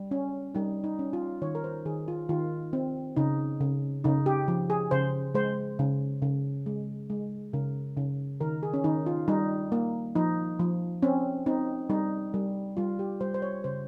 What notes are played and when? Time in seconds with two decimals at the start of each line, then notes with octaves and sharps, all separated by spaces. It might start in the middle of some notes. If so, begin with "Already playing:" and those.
Already playing: G3
0.11 C#4
0.54 G3 D#4
0.84 D#4
0.99 C#4
1.13 F4
1.42 D#3 C#5
1.55 A#4
1.64 C5
1.85 D#3 G#4
2.08 F4
2.29 D#3 F4
2.73 C4
3.16 C#3 D#4
3.61 C#3
4.04 C#3 D#4
4.26 G4
4.48 F3
4.70 G#4
4.91 C#3 C5
5.34 G#3 C5
5.79 C#3
6.22 C#3
6.66 G#3
7.10 G#3
7.53 C#3 A#4
7.97 C#3
8.40 D#3 A#4
8.63 G#4
8.74 C#4
8.84 D#3 D#4
9.06 F4
9.28 G3 D#4
9.72 A#3
10.15 F3 D#4
10.60 F3
11.02 C4 C#4
11.46 C4 D#4
11.90 G3 D#4
12.34 G3
12.77 G3 F4
12.99 G4
13.21 G3 C5
13.34 C5
13.42 C#5
13.64 C#3 C5